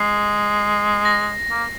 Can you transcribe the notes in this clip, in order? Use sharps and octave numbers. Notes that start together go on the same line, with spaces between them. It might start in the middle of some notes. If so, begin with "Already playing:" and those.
Already playing: G#3 C7
A#6
A#3